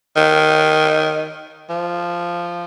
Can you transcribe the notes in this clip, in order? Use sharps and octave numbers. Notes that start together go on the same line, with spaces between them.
D#3
F3